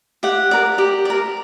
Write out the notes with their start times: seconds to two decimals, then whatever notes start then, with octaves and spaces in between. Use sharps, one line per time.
0.23 G4 F#5
0.51 A#4 D5
0.78 G4
1.05 A#4 D5